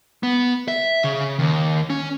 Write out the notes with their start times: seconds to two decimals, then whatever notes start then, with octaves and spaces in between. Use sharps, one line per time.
0.23 B3
0.68 E5
1.04 C#3
1.39 D#2
1.90 C#4